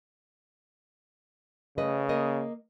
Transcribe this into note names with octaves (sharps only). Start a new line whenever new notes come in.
C#3 A3 B4 D#5
A#3 A#4 D#5